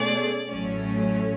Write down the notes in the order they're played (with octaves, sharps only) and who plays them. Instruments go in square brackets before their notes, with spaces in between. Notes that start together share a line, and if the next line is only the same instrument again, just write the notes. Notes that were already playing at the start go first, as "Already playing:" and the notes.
Already playing: [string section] B2 A3 C#4 G#4 [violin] D5
[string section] A1 A2 F#3 A3 C#4